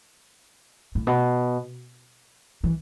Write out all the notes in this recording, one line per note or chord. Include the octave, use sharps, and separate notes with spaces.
A2
B2
E3